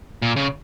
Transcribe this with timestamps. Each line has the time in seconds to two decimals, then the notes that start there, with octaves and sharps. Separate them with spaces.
0.22 A#2
0.36 C#3